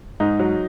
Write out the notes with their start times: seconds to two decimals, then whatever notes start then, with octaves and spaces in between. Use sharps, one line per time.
0.20 G#2 D#4
0.39 F#3